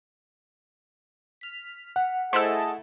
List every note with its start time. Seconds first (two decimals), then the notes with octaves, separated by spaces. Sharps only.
1.41 F6 B6
1.96 F#5
2.33 A3 E4 G#4 A4 C5 D#5 A5 E6